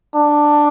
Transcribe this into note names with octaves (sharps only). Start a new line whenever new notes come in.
D4